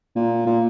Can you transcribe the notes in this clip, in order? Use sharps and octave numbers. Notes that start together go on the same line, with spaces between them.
A#2
A#2